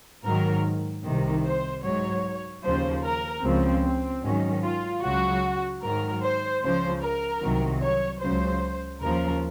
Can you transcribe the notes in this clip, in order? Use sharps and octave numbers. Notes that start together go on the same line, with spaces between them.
G#2 D#3 F#3 A#4
C2 C3 D#3
C5
G#2 F#3 C#5
D#2 C#3 F3 C5
A#4
C#2 C#3 F3 C4
C4
G#2 D#3 F#3 C#4
F4
C#2 C#3 F#3 F#4
G#2 D#3 F#3 A#4
C5
C#2 C#3 F3 C5
A#4
C2 C3 D#3 F#3
C#5
C#2 C#3 F#3 C5
D#2 C#3 F3 A#4